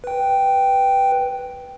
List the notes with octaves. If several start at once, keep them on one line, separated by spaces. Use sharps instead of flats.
B4 G5